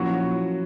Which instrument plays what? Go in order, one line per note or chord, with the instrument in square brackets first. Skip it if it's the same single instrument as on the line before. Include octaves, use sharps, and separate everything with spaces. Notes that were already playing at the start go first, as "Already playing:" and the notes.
Already playing: [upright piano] A#2 F3 A#3 C#4 E4 [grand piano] F#3 F#4